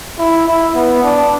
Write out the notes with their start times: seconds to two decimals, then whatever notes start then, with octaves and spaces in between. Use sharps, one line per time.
0.19 E4
0.48 E4
0.75 B3
1.03 D4